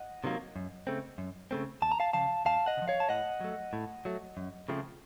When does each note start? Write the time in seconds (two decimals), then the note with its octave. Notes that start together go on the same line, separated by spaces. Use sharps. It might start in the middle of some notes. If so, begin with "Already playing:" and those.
Already playing: D#5 F#5
0.24 C3 D#3 F#3 A#3
0.56 F#2
0.87 C#3 A3 C4
1.18 F#2
1.51 C#3 A3 C4
1.82 D#2 A5
1.92 A#5
2.00 F5 A5
2.13 C#3 F3 F5 A5
2.45 D#2 F5 A5
2.66 D#5 F#5
2.77 C#3
2.82 F3
2.88 C#5 F5
3.00 A5
3.09 A2 D#5 F#5
3.41 F#3 A3
3.73 A2
4.05 F#3 A3
4.37 F#2
4.69 C#3 F3 A3 C4